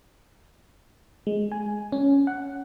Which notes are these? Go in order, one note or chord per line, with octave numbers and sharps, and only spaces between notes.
G#3
G#5
C#4
F#5